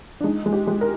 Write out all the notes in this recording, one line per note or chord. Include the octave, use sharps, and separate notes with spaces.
D4
G#3 D#4
G#3
G4
G#3
A#4